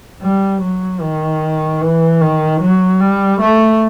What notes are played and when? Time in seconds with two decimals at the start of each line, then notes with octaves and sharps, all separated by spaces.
0.22 G3
0.61 F#3
1.01 D#3
1.81 E3
2.21 D#3
2.61 F#3
3.00 G3
3.41 A3